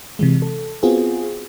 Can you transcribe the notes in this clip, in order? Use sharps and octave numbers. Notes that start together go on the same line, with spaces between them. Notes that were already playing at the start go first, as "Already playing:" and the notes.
C3 E3 G#3
A4
B3 C4 F4 F#4 G#4